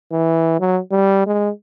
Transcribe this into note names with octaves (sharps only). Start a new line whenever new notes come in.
E3
F#3
G3
G#3